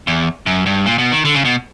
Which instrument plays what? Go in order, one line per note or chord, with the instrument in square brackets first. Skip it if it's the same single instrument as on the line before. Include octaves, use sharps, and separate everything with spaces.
[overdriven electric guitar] E2
F#2
G2
A#2
B2
D#3
D3
C#3
B2